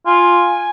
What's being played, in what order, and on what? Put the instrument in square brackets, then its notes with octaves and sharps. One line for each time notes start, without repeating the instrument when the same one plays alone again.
[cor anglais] F4 [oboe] G#5